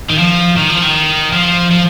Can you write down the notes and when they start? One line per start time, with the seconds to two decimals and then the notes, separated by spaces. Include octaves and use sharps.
0.10 D#3
0.18 F3
0.56 D#3
0.69 F3
0.82 D#3
1.32 F3
1.71 F3